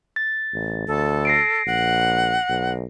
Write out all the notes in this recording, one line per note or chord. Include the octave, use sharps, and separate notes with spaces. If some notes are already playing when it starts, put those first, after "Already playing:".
A6
A1
D2 A4
A#6 C7 D7
A#1 F#5
B1